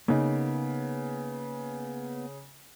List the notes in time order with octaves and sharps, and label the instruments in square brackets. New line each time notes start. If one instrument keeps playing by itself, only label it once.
[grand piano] C#3 [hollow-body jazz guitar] A#3 B3 D#4